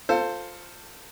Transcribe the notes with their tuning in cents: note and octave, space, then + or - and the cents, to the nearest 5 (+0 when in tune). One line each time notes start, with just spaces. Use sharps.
F4 +5 A4 +20 C5 +0